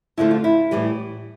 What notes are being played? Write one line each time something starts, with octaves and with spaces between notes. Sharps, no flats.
F2 D3 F3 A3 E4
F4
E4
A2 E3 G3